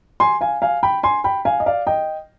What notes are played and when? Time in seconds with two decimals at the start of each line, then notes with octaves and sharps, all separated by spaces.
0.20 G#5 C6
0.41 F5 G#5
0.62 F5 G#5
0.83 G5 B5
1.03 G#5 C6
1.24 G5 B5
1.45 F5 G#5
1.60 D#5
1.66 D5 F5
1.87 D#5 G5